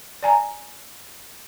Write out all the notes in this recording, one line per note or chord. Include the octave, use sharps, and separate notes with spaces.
D5 G#5 A#5